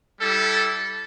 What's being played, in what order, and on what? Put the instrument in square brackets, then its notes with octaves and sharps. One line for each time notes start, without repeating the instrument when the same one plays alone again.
[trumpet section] G3 E4 A4